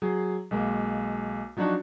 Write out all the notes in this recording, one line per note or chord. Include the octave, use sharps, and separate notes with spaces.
F#3 G#4
B1 G#3 A#3
F3 F#3 D4 D#4 F#4